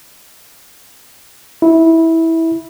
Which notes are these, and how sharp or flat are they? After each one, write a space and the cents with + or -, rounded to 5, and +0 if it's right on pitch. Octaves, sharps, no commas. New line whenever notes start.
E4 -15